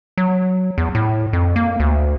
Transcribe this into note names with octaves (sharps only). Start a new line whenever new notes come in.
F#3
E2
A2
F2
A#3
D2